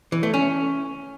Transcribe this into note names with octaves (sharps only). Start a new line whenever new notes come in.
E3
A3
C#4